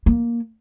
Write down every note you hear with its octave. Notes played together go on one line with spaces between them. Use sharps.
A#3